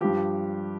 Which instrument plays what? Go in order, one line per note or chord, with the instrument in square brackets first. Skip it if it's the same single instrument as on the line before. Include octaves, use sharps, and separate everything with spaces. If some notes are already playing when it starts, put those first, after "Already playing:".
[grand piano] G2 F3 G4